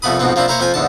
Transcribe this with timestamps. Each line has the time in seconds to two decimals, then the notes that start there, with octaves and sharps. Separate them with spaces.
0.02 C2 F2 A3 B3 B5 D#6
0.19 F2 G#2 B2 B3 C4
0.36 F3 A#3 C4 D4 E4
0.48 A#3 E4 A#4 C5 C#5
0.60 F2 F3 G5 G#5
0.74 E2 G#2 D3 A5